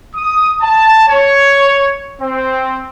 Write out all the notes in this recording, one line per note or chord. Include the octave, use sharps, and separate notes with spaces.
D#6
A5
C#5
C4